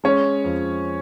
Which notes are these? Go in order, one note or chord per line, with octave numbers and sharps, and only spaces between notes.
G#3 C#4 C#5
F2